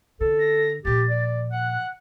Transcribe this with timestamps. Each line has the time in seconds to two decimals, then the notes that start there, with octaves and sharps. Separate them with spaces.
0.21 D3 A4
0.39 A#6
0.85 A#2 F3 G4 A6
1.10 D5
1.51 F#5 F#6